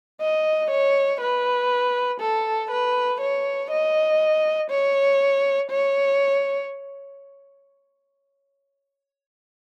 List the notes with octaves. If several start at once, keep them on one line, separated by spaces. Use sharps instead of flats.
D#5
C#5
B4
A4
B4
C#5
D#5
C#5
C#5